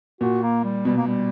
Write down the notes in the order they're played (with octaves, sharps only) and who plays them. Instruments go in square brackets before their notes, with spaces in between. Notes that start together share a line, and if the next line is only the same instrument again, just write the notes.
[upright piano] A#2 [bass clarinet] F#4
[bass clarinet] A#3
G3
[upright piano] B2 [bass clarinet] G3
[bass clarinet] A#3
G3